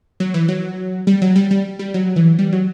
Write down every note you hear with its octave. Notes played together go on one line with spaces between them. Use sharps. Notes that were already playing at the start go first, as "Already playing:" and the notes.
F#3
E3
F#3
G3
F#3
G3
G3
G3
F#3
E3
G3
F#3